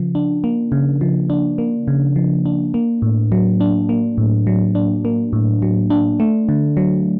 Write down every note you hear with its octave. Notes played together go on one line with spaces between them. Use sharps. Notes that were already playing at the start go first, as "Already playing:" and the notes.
Already playing: C#3 F3
D4
A#3
C#3
F3
D4
A#3
C#3
F3
D4
A#3
A2
F#3
D4
A#3
A2
F#3
D4
A#3
A2
F#3
D4
A3
D3
F#3